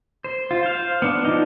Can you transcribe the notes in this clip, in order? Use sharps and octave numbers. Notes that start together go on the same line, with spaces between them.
C5
F4
C5 F5
B3 D4
F3 D#4